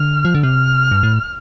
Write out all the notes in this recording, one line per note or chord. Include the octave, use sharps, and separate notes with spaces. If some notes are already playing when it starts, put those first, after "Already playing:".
Already playing: D3 F6
F3
D3
C3 F6
G2
A2